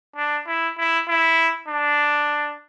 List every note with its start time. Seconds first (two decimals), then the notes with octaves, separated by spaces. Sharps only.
0.16 D4
0.47 E4
0.78 E4
1.09 E4
1.68 D4